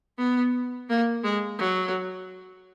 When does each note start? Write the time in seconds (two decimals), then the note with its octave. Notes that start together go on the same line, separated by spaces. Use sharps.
0.18 B3
0.89 A#3
1.24 G#3
1.59 F#3